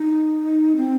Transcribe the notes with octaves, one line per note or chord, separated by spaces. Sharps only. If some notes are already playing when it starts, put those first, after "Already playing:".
Already playing: D#4
C4